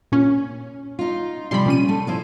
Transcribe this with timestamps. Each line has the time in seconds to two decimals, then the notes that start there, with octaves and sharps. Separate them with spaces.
0.12 A#2 C#4
0.99 D#4 F4
1.51 C3 F3 G3 B5 C6
1.66 A#2 C#4 D#7
1.89 A3
2.07 F3 E4 C5